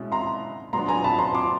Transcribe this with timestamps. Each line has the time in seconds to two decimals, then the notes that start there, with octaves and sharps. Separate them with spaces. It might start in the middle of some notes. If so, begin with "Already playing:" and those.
Already playing: B2 G#3 C#4 E4
0.12 A#5 C6
0.73 B2 F#3 B3 D4 A#5 C6
0.88 G#5 A#5
1.04 A5 B5
1.18 A#5 C6
1.34 C6 D6